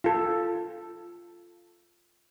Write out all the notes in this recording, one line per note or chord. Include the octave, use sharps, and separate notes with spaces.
F4 A4